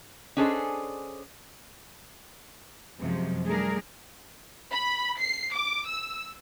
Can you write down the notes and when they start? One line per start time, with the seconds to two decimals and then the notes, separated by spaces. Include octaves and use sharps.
0.37 C#4 D4 G#4 A4 C5 D#5
2.99 F#2 C3 F3 F#3 G#3
3.45 G3 A3 D4 G#4 A#4
4.71 B5
5.19 C7
5.53 D6
5.86 E6